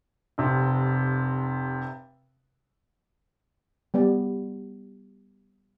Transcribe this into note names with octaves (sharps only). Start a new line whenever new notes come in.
F1 C3
G3 B3 D5